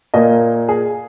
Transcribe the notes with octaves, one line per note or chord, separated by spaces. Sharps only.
A#2 A#3 D#5
G#4